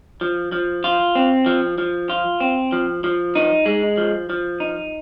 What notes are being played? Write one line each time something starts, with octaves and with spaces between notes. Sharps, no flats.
F3
F3
F4
C4
F3
F3
F4
C4
F3
F3
D#4
G#3
F3
F3
D#4